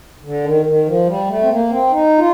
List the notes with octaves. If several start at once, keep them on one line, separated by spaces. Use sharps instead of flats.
D3
D#3
D#3
F3
G3
A3
C4
A#3
C4
D#4
F4